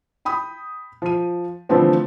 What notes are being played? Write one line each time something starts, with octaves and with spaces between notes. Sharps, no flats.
G5 B5 D#6
F3 D#7
D3 E3 F3 A3 B3 C4